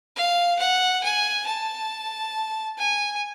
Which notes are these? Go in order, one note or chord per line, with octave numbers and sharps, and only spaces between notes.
F5
F#5
G#5
A5
G#5